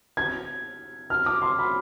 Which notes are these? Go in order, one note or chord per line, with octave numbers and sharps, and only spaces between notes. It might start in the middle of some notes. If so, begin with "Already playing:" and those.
G#6
F6
D6
C6
B5